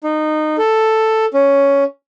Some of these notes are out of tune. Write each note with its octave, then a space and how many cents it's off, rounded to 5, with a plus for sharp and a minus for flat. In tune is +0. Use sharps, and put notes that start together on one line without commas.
D#4 -20
A4 +5
C#4 +5